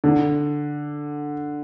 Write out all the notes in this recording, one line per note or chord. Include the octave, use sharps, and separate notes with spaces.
D3